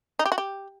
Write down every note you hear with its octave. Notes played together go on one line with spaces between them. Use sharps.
D#4
G4
F#4
G4